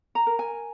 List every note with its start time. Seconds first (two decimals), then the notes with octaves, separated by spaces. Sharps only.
0.15 A#5
0.27 A#4
0.39 G#5